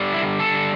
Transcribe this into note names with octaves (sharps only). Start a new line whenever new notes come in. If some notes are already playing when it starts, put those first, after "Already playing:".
Already playing: D3 G3
E4
A4